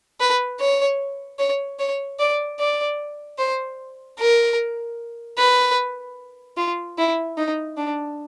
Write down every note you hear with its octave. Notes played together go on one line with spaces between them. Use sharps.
B4
C#5
C#5
C#5
D5
D5
C5
A#4
B4
F4
E4
D#4
D4